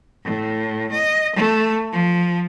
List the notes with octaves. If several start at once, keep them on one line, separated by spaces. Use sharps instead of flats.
A2
D#5
A3
F3